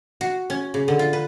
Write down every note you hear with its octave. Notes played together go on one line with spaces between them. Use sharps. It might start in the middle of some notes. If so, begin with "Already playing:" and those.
F#4
C#4
C#3
D3
F4
B4